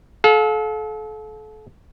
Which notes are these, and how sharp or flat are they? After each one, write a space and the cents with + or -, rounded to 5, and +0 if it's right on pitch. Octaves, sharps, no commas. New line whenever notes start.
A4 -35 F5 +30